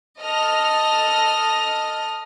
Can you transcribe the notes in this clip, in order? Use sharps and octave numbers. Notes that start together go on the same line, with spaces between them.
A4 D#5 F6 A#6